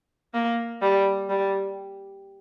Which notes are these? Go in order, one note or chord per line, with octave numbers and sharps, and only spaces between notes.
A#3
G3
G3